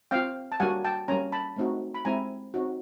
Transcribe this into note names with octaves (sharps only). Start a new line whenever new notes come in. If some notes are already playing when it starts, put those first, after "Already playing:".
C4 F4 F5 G5
A5
G3 A#3 D4 F#4 F#5 G#5
G5 A5
G3 A#3 C#4 G#5 A#5
A5 B5
A3 C4 D#4 F#4
B5
G#3 C4 E4 G#5 A#5
C4 D#4 F#4